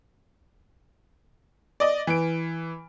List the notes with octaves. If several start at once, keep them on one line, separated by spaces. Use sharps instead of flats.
D5 D#5
E3 D7